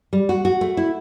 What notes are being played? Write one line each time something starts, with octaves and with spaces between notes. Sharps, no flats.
G3
F#4
F#4
A3
E4